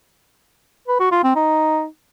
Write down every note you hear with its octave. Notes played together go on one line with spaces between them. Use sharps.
B4
F#4
F4
C4
D#4